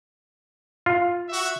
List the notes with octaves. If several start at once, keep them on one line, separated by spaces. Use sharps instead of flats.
F4
F#4 E5